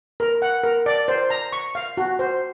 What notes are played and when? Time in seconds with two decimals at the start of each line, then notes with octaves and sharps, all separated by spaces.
0.20 A#4
0.42 F#5
0.64 A#4
0.86 D5
1.08 C5
1.30 A#5
1.52 C#6
1.75 F5
1.97 F#4
2.19 C5